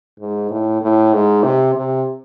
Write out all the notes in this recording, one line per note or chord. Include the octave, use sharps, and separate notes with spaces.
G#2
A2
A2
G#2
C3
C3